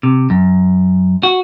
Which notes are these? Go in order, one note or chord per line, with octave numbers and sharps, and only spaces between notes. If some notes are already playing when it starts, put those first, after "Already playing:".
C3
F#2
F#4